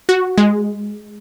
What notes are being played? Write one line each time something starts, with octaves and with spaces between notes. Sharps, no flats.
F#4
G#3